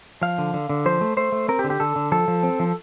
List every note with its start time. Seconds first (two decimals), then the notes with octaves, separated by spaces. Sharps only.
0.22 F3 F5
0.38 D3
0.54 D3
0.69 D3
0.86 F3 C5
1.01 A3
1.17 A3 C5
1.32 A3
1.48 C4 A#4
1.59 G4
1.64 D3
1.70 G4
1.80 D3 A4
1.96 D3
2.12 F3 A4
2.28 F3
2.43 C4
2.60 F3